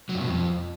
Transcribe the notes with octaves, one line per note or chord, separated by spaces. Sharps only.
F#3
G2
B2
F2